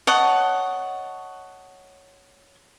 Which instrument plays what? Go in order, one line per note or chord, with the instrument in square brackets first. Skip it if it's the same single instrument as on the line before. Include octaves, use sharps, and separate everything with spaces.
[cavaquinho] C#5 D#5 F#5 A5